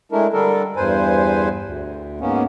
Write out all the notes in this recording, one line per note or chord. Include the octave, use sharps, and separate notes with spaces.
G#3 A3 D4 E4 A#4
D3 G3 D4 A4 A#4
E2 G2 B4 C5 G#5
D2
G#2 A#3 B3 C#4